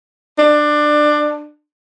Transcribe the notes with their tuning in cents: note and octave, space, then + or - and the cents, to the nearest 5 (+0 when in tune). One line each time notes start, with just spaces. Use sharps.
D4 +20